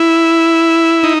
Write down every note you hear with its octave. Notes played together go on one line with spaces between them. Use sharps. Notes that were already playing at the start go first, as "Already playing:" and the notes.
Already playing: E4
D#4